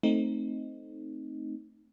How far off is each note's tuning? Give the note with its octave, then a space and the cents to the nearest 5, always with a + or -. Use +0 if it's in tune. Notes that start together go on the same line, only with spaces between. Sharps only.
A3 +0 C4 +0 D#4 +0